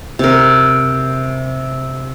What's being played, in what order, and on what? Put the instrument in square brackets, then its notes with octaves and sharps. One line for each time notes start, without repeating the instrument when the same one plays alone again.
[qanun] C3 A#4